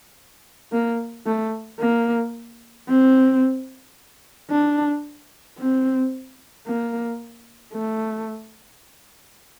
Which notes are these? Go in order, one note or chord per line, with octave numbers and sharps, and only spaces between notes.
A#3
A3
A#3
C4
D4
C4
A#3
A3